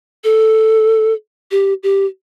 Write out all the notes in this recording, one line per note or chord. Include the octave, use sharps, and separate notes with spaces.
A4
G4
G4